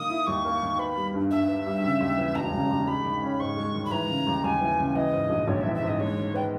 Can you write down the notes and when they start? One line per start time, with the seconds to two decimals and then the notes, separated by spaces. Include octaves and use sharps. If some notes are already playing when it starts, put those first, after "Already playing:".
Already playing: D#3 A#3 D#6
0.10 E4
0.27 D#2 C#6
0.45 A#3
0.62 D#3
0.79 B3 B5
0.96 G3
1.14 G2
1.31 G2 E5
1.48 B3
1.66 G3
1.84 C#3
2.00 D#2
2.18 E3
2.35 E1 A#5
2.53 C#3
2.71 D#2
2.87 G#3 B5
3.05 D#3
3.22 C#4
3.40 G#2 C#6
3.57 G#3
3.75 D#3
3.85 B5
3.91 E3 A#5
4.09 C#3
4.27 D#2
4.44 D#2 G#5
4.61 E3
4.79 C#3
4.95 E3 D#5
5.13 G#2
5.30 A#1
5.47 A#1 C#5
5.61 E5
5.66 E3
5.74 E5
5.82 G#2 D#5
6.00 G#3 C#5
6.18 D#3
6.34 B3 G5